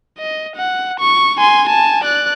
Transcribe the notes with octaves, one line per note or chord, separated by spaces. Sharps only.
D#5
F#5
C#6
G#5 C6
G#5 A5
D5 F#6